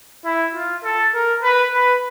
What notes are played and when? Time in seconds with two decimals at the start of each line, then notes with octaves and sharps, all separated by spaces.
0.25 E4
0.55 F4
0.84 A4
1.14 A#4
1.43 B4
1.73 B4